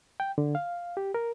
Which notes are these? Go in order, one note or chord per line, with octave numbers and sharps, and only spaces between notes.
G5
D3
F5
G4
A#4